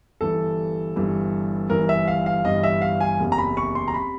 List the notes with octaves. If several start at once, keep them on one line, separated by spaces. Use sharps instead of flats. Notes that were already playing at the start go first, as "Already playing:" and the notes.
G1 G2 E3 A4
G1 G2 E3
G1 G2 E3 A#4
E5
F5
F5
G1 G2 E3 D#5
E5
F5
G#5
F#1 E2 C3
A#5
B5
C#6
C6
A#5
C3 B5